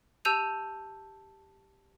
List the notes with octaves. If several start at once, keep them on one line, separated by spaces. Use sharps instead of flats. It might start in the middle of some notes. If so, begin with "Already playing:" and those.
G4 A5 E6 G6 D#7 F7